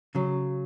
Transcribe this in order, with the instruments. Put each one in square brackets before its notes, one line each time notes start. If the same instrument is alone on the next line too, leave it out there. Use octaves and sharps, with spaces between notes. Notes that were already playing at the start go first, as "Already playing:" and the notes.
[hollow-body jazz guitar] C#3 F#3